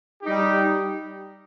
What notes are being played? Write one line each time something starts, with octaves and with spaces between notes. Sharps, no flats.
G3 D#4 G4